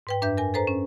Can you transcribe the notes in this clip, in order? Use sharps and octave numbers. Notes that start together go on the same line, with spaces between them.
G#2 B4 G5
F#2 D4 B4 E5 G6
A#4 G#5
A4 B4 C5 A#5
C#4